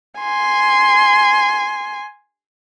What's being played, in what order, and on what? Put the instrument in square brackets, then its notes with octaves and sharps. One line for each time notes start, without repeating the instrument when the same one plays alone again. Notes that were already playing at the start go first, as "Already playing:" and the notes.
[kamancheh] G#5 C6